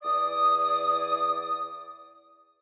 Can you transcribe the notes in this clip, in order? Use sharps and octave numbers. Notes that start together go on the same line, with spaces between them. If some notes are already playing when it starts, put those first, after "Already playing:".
E2 D5 D#6